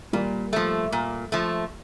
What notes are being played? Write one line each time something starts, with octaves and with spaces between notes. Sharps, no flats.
A#2 G3 A#3
F3 A3
A#2
F3 A3